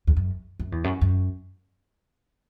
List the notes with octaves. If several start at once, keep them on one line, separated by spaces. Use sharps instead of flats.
E2
F#2
F#2
E2
F#2
F#2